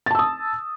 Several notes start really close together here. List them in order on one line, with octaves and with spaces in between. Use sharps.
A6 A5 E6 D#6